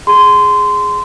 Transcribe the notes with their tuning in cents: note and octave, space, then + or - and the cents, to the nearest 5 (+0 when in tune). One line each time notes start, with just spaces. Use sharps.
G#4 +0 C6 -20